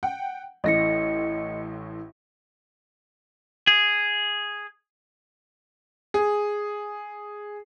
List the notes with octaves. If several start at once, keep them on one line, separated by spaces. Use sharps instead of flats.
F#5 G5
A1 A2 D#5 A#6 C#7
G#4
G#4